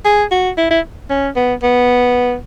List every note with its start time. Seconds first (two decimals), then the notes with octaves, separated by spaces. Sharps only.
0.05 G#4
0.31 F#4
0.57 E4
0.70 E4
1.10 C#4
1.36 B3
1.63 B3